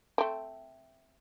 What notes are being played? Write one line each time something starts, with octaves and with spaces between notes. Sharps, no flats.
A3 C4